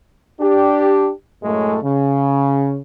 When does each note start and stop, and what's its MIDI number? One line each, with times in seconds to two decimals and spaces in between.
0.41 1.10 62
0.41 1.10 67
1.43 1.77 42
1.43 1.77 45
1.43 1.77 56
1.43 1.77 57
1.83 2.79 49